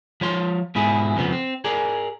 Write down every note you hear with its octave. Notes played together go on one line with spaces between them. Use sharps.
F3 C#5 C6
G#2 B2 E4 G#4
F2 C#3 F3 B3
C4
G#4 A#4 D5